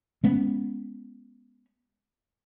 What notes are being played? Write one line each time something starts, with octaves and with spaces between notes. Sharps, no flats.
G#3 B3 C#4